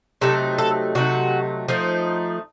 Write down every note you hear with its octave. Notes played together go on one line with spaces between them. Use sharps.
C3 F#3 A3 D#4 A4
A4
C3 F#3 A3 D#4 F#4
F3 A3 D#4